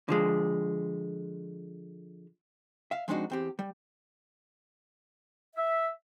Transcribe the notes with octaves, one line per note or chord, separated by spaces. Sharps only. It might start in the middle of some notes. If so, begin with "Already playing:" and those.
D3 F3 G#3
E5 F5
F3 G#3 C4 D4 D#4 F#4
E2 C4 G4
G3
E5